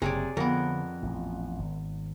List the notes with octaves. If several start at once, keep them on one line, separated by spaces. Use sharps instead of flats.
F#1 C3 G#4 C#5 D5
F2 D3 F3 B3 A#4
A1 A#2
G#1